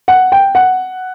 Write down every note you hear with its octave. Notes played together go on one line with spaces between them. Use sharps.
F#5
G5
F#5